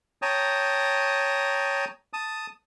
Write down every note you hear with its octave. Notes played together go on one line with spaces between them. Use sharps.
C#5 G5 A5 A#5 D#6
A5 D#6